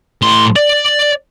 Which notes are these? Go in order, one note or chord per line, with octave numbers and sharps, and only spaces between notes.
A2 C6
D5